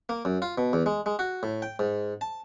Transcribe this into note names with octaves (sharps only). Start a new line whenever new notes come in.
A#3
F#2
F4
B2
E2
G#3
G#3
F#4
A2
G5
G#2
A5